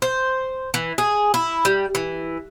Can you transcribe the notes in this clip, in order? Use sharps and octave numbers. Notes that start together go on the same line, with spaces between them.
C5
E3
G#4
E4
G3
E3